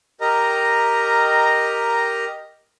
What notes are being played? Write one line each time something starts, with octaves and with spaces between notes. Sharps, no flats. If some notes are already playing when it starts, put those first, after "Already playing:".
G4 A#4 D#5 A#5